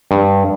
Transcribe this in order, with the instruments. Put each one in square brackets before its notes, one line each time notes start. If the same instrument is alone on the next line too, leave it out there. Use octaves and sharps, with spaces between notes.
[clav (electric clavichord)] G2